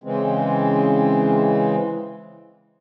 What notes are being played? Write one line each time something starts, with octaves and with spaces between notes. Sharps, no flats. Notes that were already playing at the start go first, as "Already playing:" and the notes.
C#3 E3 G#3 C4